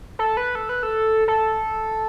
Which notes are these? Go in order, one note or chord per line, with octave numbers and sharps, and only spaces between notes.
A4
B4
A4
B4
A4
A4